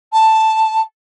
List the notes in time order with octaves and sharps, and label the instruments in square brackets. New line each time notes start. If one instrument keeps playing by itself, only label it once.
[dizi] A5